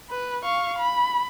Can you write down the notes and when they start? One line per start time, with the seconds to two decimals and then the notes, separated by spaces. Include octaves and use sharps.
0.10 B4
0.44 F5 C#6
0.79 B5